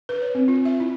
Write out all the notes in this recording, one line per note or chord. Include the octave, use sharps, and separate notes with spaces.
B4
C#5
C4
F4
E5
E4